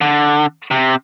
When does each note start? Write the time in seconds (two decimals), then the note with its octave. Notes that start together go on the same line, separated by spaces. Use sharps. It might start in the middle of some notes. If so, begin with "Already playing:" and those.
0.01 D3
0.71 C3